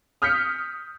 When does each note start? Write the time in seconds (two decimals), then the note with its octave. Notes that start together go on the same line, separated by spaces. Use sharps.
0.22 D#6 F6 G6 B6 C#7